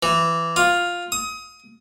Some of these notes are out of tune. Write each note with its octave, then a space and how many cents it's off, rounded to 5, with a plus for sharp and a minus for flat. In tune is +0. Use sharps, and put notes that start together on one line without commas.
E3 +15
F4 +5
D#6 +25